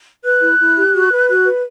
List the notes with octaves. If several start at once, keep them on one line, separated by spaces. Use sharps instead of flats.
B4 F#6
E4
E4
G4
F#4
B4
F#4 F#6
B4